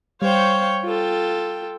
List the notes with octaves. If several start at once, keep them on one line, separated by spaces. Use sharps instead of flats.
G3 C5 C#5 F5 G5 C#6
F4 A4 G5